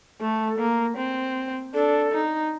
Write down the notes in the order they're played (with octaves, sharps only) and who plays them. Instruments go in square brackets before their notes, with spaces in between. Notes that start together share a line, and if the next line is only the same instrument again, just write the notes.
[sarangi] A3 [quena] A4
[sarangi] A#3
C4
[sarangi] D4 [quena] A4
[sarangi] D#4